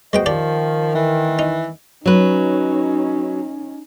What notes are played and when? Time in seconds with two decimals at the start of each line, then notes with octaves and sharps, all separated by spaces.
0.13 G#3 B3 F#4 C5 D#5 G5
0.26 D#3 F3 G4 D5
0.95 E3
1.39 D#4
2.06 F#3 C#4 D#4 B4